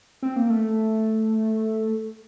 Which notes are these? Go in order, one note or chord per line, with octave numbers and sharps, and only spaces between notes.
C4
A#3
A3